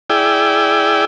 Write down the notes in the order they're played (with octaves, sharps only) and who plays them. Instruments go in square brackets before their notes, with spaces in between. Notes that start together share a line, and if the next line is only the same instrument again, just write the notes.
[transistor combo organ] E4 G#4 D5 G5